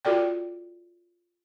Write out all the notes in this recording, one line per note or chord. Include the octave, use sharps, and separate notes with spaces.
F4 F#4 A4 D5 G5